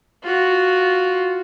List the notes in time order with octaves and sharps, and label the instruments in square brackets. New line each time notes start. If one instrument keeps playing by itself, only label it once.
[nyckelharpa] F4 F#4